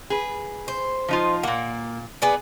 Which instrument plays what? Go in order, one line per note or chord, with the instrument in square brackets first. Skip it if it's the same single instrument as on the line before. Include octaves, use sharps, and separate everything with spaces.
[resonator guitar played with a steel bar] G#4 B4
[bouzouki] C5
[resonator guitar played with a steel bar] F3 D#4 F4
[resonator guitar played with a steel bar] A#2 F#5 [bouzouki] A#3
[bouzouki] B3 G#4 D5